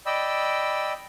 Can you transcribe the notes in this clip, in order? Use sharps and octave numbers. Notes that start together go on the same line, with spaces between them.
D5 D#5 G5 B5 E6